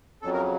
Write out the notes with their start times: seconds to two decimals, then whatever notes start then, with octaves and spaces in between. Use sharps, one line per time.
0.22 F2 C#3 F#3 A4
0.33 A#4